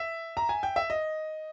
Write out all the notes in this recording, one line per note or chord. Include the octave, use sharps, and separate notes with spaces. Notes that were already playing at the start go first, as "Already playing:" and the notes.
Already playing: E5
A#5
G#5
G5
E5
D#5